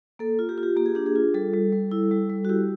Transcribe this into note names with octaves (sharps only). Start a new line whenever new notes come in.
A#3 A4
F4
G4
F4
G4
A#3 G4
G#4
D4 G4
G#4
F4
G3 A4
G3
G3
E4
G3
G3
F#4
E4 G4